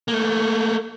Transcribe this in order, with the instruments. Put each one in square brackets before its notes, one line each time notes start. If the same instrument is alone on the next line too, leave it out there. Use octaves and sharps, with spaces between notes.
[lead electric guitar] A3 A#3